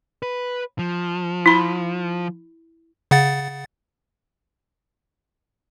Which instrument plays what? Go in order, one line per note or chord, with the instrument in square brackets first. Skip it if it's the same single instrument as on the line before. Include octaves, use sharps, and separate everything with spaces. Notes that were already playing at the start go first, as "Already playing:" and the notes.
[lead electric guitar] B4
F3
[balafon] E4 B5
[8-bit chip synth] C#3 F#5 A6